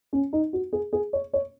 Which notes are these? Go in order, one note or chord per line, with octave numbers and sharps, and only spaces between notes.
C#4
D#4
F#4
G#4
G#4
C#5
C#5